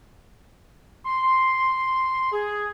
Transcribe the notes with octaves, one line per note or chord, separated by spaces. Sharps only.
C6
G#4